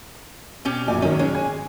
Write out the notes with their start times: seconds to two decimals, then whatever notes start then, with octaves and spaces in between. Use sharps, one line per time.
0.65 B2 C#4 G4
0.88 A#1 F#2 G#5
1.02 D#3 F#3 C#4
1.19 G#3 C#4
1.35 G#5